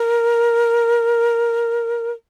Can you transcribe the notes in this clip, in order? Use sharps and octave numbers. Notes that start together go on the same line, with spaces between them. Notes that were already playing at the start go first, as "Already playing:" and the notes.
Already playing: A#4